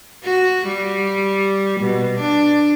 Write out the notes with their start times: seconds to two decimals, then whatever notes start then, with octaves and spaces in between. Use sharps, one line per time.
0.24 F#4
0.67 G3
1.81 B2
2.20 D4